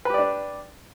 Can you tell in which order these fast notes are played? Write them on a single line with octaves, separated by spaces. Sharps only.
B4 G4 D5 D4